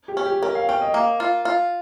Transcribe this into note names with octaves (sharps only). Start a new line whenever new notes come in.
G4
C#4
G4
C#4 A#4
F5
C#4 G5
D#5
A#3
F4
F4